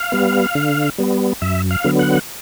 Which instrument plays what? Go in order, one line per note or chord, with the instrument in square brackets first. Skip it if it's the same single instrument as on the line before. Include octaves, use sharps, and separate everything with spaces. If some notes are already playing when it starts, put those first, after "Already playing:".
Already playing: [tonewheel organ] F5
G3 B3
D3
G3 B3
F#2 E5
F5
D3 F#3 B3
F#5